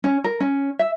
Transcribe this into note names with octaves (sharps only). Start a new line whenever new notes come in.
C#4
A#4
C#4
E5